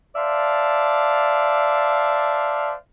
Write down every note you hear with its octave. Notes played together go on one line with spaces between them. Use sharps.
C5 D5 E5 F5 A5